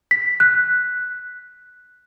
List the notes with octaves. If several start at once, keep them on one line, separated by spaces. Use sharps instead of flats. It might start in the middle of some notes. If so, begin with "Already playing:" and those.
B6
F#6